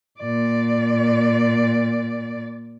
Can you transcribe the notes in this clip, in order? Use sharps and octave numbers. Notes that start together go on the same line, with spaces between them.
A#2 D5